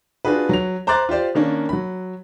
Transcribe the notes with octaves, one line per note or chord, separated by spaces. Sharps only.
D4 F4 F#4 G#4 B4
F#3 F7
C5 A#5 C6 D6 F#6 A6
F4 G4 C5 D5
D#3 A#3 C#4 D4
F#3 B5